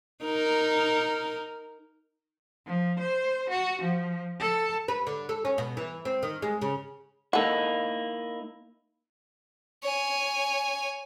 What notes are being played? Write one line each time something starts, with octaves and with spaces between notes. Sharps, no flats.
D#4 A#4
F3
C5
F#4
F3
A4
B4
D3
A4
C#4
B2
E3
C4
D#3
G#3
C#3
A#3 D#4 E4 A4 F#5
C#5 G#5